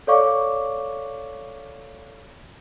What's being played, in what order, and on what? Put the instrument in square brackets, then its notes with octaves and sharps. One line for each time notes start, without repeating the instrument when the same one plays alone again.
[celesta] A4 C#5 D5 F5 C#6 D6